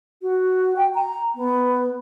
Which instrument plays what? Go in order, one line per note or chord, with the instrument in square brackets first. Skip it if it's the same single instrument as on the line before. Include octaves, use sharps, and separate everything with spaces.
[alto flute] F#4
G5
A#5
B3